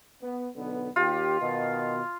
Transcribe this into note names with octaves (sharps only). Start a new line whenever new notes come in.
B3
B1 D3 B3
D#2 F4 G4
B2 D#3